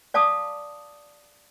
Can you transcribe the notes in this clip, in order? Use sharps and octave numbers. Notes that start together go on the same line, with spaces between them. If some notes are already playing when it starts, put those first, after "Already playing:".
D5 F5 A5 D6 D#6